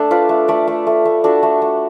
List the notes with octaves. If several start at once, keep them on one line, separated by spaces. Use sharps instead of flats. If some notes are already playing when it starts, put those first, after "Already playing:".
Already playing: A3 D4 A4
F4 B4 D5
A3
A3 B4 D5
A3
A3
A3
D4 F#4 A4
A3
A3